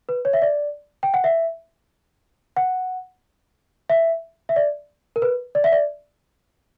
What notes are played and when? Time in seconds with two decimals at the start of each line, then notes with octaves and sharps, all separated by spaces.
0.09 B4
0.25 C#5
0.33 E5
0.42 D5
1.03 G5
1.14 F#5
1.24 E5
2.56 F#5
3.90 E5
4.49 E5
4.56 D5
5.16 A#4
5.22 B4
5.55 D5
5.64 E5
5.72 D5